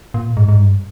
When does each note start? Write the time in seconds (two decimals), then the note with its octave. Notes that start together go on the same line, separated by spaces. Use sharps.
0.14 A#2
0.37 G#2
0.49 G#2
0.59 G2